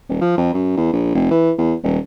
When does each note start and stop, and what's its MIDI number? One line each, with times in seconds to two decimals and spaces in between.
0.09 0.20 27
0.21 0.34 53
0.38 0.49 41
0.54 0.76 42
0.77 0.90 40
0.93 1.10 34
1.14 1.28 29
1.31 1.52 52
1.58 1.74 40
1.83 1.98 27